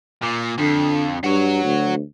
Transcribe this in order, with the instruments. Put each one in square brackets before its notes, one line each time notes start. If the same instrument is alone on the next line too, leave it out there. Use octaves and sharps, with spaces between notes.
[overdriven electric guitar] A#2
[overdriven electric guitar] F2 [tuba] D3
[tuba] G2 [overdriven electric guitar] F#4 C#5
[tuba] D2